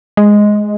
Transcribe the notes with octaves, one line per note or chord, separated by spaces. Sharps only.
G#3